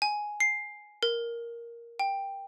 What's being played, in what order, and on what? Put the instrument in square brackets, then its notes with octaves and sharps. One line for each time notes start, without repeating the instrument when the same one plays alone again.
[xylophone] G#5
C7
A#4
G5